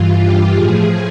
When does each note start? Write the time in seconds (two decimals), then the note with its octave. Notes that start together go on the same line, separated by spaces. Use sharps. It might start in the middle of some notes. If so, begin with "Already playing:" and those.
Already playing: G2 E3 F4
0.18 G4
0.53 A2 F3 G#4